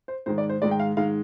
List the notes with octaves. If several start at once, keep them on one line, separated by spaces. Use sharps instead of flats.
C5
G#2 D#3 G#3 C5
D5
C5
G#2 D#3 G#3 D5
G5
F5
G#2 D#3 G#3 F5